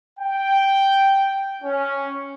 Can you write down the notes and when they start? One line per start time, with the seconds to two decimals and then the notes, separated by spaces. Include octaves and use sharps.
0.20 G5
1.62 C#4